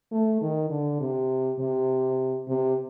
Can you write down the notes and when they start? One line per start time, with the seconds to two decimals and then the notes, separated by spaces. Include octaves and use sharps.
0.12 A3
0.41 D#3
0.70 D3
1.00 C3
1.59 C3
2.48 C3